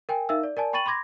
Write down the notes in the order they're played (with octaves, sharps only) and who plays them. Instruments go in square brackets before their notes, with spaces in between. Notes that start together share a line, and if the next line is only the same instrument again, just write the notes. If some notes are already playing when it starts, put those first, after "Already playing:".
[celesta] A#4 G5 G#5
D#4 A#4 E5 F5 E6
D5
A#4 D5 G#5 A5
G5 B5 C#6 A6 D#7 F#7
B5 C6 D6 G#6 A#6